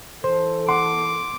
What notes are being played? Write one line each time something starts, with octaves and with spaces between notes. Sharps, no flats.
E3 A4 C5
F#5 C6 D6